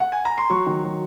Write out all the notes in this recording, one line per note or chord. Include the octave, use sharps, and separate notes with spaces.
F#5
G#5
A#5
C6
F#3 C#6
D#3
F#3